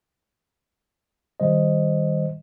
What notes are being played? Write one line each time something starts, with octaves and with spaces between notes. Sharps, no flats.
D#3 G3 C5 D#5